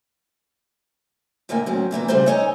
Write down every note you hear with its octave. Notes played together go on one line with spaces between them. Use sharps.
D#2 A2 D3 A#3 G#5
A2 F#3 C4 C#4
A#2 E3 A#3 B3
D2 G2 C#3 G3 A3 C5
D#4 A4 C#5 D#5 G5 G#5